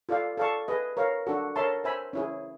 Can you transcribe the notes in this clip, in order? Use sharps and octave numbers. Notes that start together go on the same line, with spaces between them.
F4 A4 D5 F5
A4 D5 F5 A5 C#6
G#4 B4 D#5
A#4 C#5 F5
D4 F#4 A4
A#4 C#5 E5 A5 C6
C5 E5 G#5 B5
C#4 E4 G#4